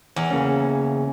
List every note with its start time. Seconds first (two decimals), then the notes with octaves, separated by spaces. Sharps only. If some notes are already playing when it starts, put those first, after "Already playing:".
0.16 E2
0.31 C#3 A#3 C#4